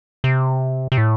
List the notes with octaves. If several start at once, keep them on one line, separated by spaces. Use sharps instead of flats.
C3
C3
A2